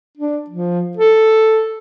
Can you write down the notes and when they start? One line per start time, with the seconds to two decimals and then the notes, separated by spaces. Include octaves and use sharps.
0.17 D4
0.50 F3
0.97 A4